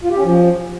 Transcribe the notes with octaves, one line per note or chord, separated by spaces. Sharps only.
F4
G4
C#4
F3